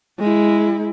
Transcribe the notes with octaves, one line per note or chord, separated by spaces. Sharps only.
G#3 E4